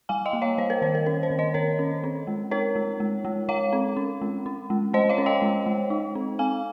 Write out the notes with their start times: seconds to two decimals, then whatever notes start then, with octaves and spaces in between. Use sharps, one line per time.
0.09 G3 F5 G#5
0.26 D#5 G5
0.33 A#3
0.42 C#5 F5
0.58 G3 C5
0.70 A#4
0.82 D#3 C5
0.95 A#4
1.06 C#4 A#4
1.23 C5
1.30 D#3
1.39 C5 D#5
1.54 D#3 A#4 C#5
1.79 C#4
2.04 C4
2.27 G#3
2.51 D#4 A#4 C#5
2.76 G#3
3.00 G#3
3.25 G#3
3.48 G#3 C#5 F5
3.73 C4
3.97 C#4
4.22 G#3
4.46 C#4
4.70 G#3
4.94 G#3 C5 D#5
5.09 C#5 F5
5.18 C#4
5.26 D#5 G5
5.42 G#3
5.66 G#3
5.90 D#4
6.15 C4
6.39 C4 F5 G#5